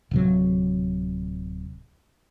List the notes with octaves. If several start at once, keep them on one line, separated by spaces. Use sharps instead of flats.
D1 C3 F#3